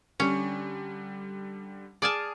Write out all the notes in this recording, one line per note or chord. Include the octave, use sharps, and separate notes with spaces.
D3 G3 C#4
G#4 D5 G#5 A5 D#6 F6